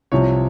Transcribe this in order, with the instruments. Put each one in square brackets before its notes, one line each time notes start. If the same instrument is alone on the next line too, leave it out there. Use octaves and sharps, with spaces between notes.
[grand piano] C2 C3 F3 C#5